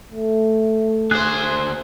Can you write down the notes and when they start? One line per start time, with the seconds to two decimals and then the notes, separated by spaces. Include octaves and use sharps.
0.11 A3
1.11 D2 G#4 C5 F#6